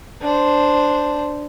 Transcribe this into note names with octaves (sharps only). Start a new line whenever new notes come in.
D4 C5